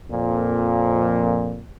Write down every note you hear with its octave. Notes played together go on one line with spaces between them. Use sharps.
F2 A#2